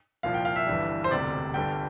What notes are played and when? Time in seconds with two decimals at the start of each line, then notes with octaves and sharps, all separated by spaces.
0.23 C2 A#2 F3 F5
0.34 G5
0.45 F5
0.56 E5
0.67 G1 G2 E3 G3
1.04 C5
1.10 E1 D2 C3 G3 D5
1.54 G1 G2 D3 G3 G5